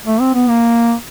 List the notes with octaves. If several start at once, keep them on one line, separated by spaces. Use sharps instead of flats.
A3
C4
B3
A#3